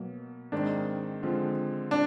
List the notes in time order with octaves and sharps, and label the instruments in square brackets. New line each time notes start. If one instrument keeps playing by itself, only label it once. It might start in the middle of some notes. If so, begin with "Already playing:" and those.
Already playing: [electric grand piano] B2 F#3 A#3
[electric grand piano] G#2 D#3 G#3 C4 [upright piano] D4
[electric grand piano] D3 F3 G#3 C4 F4
[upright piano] D4